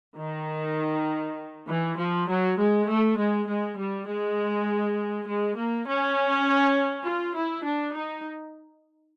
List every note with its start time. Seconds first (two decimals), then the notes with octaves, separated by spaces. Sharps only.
0.19 D#3
1.68 E3
1.98 F3
2.28 F#3
2.57 G#3
2.87 A3
3.17 G#3
3.47 G#3
3.77 G3
4.06 G#3
5.26 G#3
5.55 A#3
5.85 C#4
7.05 F4
7.35 E4
7.64 D4
7.95 D#4